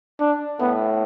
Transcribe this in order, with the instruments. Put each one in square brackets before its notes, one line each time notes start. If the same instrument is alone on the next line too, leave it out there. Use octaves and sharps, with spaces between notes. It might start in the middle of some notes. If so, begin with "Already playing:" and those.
[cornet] D4
[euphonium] A2 [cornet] B3